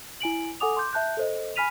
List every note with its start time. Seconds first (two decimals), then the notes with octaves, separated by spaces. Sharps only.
0.20 E4 G#5 D7 F#7
0.60 A4 F#5 G#5 D6 D#6 F7
0.77 C6 D6 G6
0.93 E5 A5 F#6 G6
1.17 A4 C5 D#5
1.56 G#5 B5 F6 B6 D#7 F7